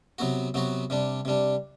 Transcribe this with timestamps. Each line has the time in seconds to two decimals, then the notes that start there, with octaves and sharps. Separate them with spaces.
0.18 C3 F#3 B3 F#4
0.54 C3 F#3 B3 F#4
0.90 C3 G3 D4
1.25 C3 G3 D4